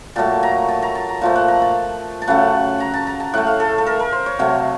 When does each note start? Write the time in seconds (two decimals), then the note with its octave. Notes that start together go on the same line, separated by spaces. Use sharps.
0.16 A#2 F#3 A3 A5
0.43 A#5
0.68 A5
0.82 A#5
0.95 A5
1.09 A#5
1.21 A#2 F3 A3 A5
1.36 F#5
1.48 A#5
1.62 A5
2.22 A5
2.28 C#3 F#3 A3 F#5
2.80 A#5
2.94 A5
3.07 A#5
3.20 A5
3.34 A2 A3 F#5
3.47 F5
3.60 A4
3.78 A4
3.86 A#4
3.99 A#4
4.12 C5
4.26 C#5
4.39 C3 F#3 A3 F5